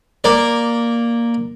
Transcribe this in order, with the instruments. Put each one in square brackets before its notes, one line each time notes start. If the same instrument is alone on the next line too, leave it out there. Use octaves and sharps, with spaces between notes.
[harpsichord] A#3 D5